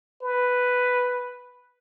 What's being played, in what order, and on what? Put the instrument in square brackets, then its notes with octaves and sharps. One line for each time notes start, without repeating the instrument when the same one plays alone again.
[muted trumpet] B4